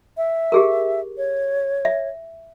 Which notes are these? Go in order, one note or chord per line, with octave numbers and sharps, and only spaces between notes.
E5
G4 G#4 A#4
C#5
E5